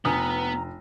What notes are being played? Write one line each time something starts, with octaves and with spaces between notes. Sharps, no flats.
F1 B3 D4 A#5 D#6